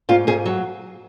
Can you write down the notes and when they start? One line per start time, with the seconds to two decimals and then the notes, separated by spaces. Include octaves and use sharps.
0.09 G#2 F4
0.27 G#2 G#4
0.46 F#3